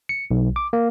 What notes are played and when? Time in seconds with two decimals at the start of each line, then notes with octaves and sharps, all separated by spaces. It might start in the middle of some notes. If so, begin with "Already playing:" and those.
0.09 C#7
0.31 B1
0.56 D6
0.73 A#3